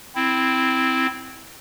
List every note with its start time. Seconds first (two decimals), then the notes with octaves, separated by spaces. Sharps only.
0.15 C4 E4